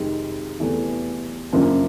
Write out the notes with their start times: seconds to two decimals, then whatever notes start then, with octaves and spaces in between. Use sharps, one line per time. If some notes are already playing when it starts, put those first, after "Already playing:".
Already playing: F2 C3 D#3 G#3
0.60 E2 C3 E3 A3
1.53 F#2 C#3 F3 A#3 D4